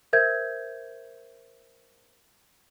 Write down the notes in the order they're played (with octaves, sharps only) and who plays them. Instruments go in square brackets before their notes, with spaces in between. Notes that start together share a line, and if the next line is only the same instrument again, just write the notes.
[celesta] A#4 C5 E5 G6 G#6